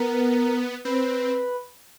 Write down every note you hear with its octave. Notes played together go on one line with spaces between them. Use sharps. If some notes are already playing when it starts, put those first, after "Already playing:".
Already playing: B3 A#4
C4 B4